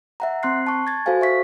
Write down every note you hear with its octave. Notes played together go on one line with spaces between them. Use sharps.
E5 F#5 A#5
C4 C6 F#6 C7
A5 C#6
G#6 A6
F#4 A4 C5 F5 G#5
E5 C#6 B6